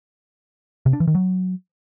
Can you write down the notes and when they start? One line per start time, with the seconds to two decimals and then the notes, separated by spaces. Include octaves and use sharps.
0.86 C3
0.93 D4
1.00 E3
1.07 D#3
1.15 F#3